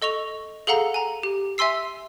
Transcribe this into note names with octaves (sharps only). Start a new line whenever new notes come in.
A4 D#5 C#6 F7
G#4 A4 F5 F#5 A#5
G#5 A#5
G4
E5 G#5 C6 E6 C7